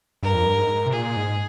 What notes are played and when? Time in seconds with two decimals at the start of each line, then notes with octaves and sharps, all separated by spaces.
0.23 G2 A#4
0.34 F2
0.46 G2
0.58 G#2
0.86 C3
0.93 A#2 G#4
1.16 G#2